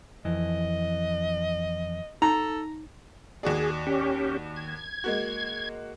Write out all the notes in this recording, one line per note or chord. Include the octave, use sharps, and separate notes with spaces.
F2 E3 D#5
D#4 A4 A#5
D#2 F#4 G#4 D5
C#4 G4
G#6
G#3 A#3 F#4